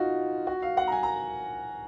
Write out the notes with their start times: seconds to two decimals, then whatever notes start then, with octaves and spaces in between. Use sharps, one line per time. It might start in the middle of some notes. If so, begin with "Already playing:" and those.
Already playing: D#4 F4 F#4
0.47 F#4
0.62 F5
0.77 F#5
0.87 A#5
0.92 G#5
1.03 A#5